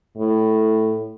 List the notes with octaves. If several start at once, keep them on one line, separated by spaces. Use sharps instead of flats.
A2